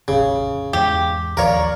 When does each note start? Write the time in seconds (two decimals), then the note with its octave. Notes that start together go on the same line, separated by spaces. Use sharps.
0.08 F1 A#1 C#3
0.73 E2 G#2 G4
1.37 A#1 D#2 F3 A#4 C#5 D5 F5 A#5